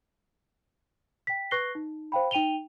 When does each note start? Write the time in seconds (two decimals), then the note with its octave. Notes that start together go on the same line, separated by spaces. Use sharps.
1.27 G5 B6
1.51 B4 C#6 F#6 A#6 C7 G7
1.75 D#4
2.12 C5 F5 G5 B5
2.31 D#4 G5 D#7 F7 G7